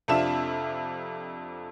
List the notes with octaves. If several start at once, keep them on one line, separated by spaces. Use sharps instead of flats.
F2 C3 D4 F4 E5 E7